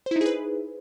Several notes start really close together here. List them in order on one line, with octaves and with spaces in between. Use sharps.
C5 E4 D#4 G#4 B4